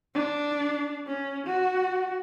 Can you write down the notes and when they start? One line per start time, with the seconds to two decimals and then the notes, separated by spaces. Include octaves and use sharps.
0.14 D4
1.07 C#4
1.46 F#4